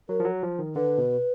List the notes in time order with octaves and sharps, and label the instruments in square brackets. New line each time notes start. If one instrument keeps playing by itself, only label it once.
[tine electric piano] F#3 [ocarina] A#4
[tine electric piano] F3
F#3
F3
D#3
[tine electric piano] D3 [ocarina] B4
[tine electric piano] B2